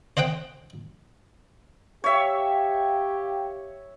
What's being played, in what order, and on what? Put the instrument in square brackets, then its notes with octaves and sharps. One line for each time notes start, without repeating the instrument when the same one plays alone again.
[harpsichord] C5 D#5 F#5 G5
[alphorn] G4 [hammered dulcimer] C#5 E5 [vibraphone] F5 G5